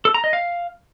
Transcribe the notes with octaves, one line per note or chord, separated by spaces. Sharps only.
A4
A#5
D#5
F5